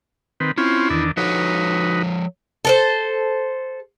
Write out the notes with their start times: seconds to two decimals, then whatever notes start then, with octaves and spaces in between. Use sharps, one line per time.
0.40 D#3 C4 B4
0.58 C4 C#4 E4 F4
0.90 E2 D#3 D4
1.17 F3 D#4 F#4 A4 B4 C#5
2.65 A4 A#4 C5